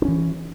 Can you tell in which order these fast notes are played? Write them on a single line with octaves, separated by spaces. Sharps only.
D4 C#4 E3